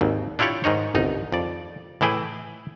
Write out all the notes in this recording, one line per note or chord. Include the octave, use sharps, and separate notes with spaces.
G#1 D#2
D4 E4 F4 G4 C#5 D5
G#2 D#3 D#4 C#5
G1 C2 D#4
F2 D5
A2 E3 E4 G#4 G5